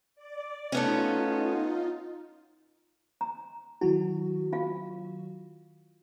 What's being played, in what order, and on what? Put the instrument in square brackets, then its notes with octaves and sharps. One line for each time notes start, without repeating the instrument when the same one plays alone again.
[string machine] D5
[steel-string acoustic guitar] A3 B3 C#4 [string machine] D#4 F4
[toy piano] A#5
[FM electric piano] D#3 F#3 F#4 [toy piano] E4
[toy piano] F4 F5